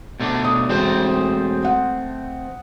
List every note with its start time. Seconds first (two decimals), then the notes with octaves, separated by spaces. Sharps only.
0.20 B2 A3 D4
0.44 D#6
0.69 E1 A3 C4 C5
1.65 F#5